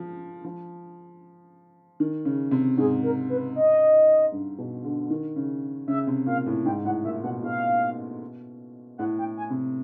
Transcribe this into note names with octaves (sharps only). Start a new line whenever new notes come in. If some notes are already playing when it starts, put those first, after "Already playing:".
Already playing: F3
F3
D#3
C#3
C3
G#2 G#4
A#4
B4
D#5
G2
B2
D3
D#3
C#3
C#3 E5
C3
A#2 F5
A2
G#2 G5
A2 F#5
A#2 E5
B2 F#5
B2 F5
A2 F#5
G5
G#5
C3